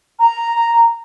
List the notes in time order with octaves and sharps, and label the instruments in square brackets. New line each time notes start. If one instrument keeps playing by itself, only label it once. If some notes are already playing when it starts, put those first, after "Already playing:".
[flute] A#5